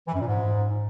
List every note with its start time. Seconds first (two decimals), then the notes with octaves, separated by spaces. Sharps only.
0.07 E3
0.14 F#2
0.20 A#2
0.27 G#2